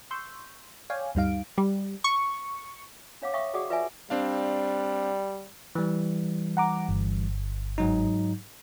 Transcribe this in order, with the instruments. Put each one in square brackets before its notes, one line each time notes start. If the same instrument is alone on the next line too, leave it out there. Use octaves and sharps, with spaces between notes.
[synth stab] C6 C#6 E6 G6
C#5 D5 F5 G5 G#5
D2 G2 G3 D#4 F5 D7
G3
C#6
[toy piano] D4 C#5 F5 F#5 D6
E5 F5 G5 C#6 D#6
F#4 G#4 D5 F#5 D6 D#6
F4 B4 D5 E5 G5 G#5
[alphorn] G3 [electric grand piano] C4 D4 F5
[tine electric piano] E3 G3
[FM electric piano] F#5 A#5 D6
G1
[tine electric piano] G#2 F#3 D#4